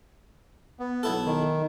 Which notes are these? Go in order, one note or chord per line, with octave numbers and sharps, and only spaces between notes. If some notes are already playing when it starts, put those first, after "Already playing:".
B3
B1 E4 A4
D#3